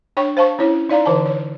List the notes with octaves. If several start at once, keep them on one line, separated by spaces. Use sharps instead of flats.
D4 C#5 G5 C#6
C5 F5 A5 C#6
C#4 E4 C#5
D#4 D5 F5 A#5
D3 E3 A5
C#5